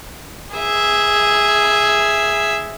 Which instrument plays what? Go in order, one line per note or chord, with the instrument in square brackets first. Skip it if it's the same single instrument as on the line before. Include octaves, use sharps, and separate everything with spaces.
[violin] G#4 E5